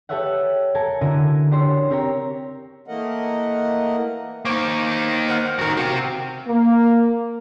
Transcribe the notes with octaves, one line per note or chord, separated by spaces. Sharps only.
G4 A4 B4 C#5 E5 F#5
A4 A#4 G#5 A5
D3 E4 F#4 A#4 D#7
D4 G4 C5 C#5 C6
C4 G4 A#4 C#5 G5 A#5
E3 A3 A#3 A#4 D#5 F#5
A#3 D#4 C5 C#6 D6
C5 F#5 F6
A1 D#3 F#4 A#4
C3 C4 F#4 F5
A#3